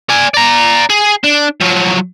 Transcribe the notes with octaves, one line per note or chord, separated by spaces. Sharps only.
D5 G#5
D5 A#5
G#4
D4
F3 F#3